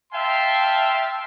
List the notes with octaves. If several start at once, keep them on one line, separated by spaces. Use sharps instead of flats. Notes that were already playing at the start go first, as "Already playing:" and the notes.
E5 F5 G5 A5 C6